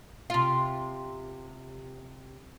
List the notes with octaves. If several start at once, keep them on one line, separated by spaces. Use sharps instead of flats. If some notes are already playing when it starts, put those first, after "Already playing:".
C3 F4